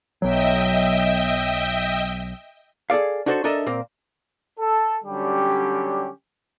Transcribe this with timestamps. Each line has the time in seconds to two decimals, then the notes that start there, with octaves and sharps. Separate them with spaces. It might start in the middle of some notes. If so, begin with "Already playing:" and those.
0.22 B1 F#3 D#5 E5 G5
2.90 G#4 A4 D5 F5
3.26 D4 D#4 F#4 A4 C5
3.44 D4 D#4 A4 A#4 D#5 E5
3.66 A#2 A#3 C4
4.59 A4
5.04 D3 F#3 G3 C#4 G4